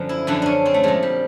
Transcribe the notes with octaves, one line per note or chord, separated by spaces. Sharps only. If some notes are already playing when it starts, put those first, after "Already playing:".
Already playing: F#2 D3 F3
E4
F#2 D3 F3 D4
C#4 D4
C4
A3
A#2 F3 G#3
G3